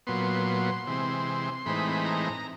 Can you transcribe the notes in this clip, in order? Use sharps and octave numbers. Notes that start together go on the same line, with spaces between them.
A#2 F#3 B3 C6
C3 E3 G#3 C4
A2 E3 G#3 C4 D#4 B5
A#5